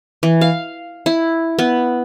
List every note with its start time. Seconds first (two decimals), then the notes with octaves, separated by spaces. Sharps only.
0.23 E3
0.41 F5
1.06 E4
1.59 B3